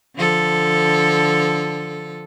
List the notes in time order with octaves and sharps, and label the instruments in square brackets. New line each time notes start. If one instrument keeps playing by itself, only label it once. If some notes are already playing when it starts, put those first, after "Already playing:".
[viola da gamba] D3 F3 A4